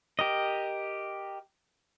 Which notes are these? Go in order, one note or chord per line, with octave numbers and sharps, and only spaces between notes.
G4 A#4 D#5